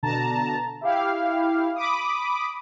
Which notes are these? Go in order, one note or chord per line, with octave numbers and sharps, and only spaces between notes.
B2 D3 A5 A#5
E4 G4 F5
B5 D6 D#6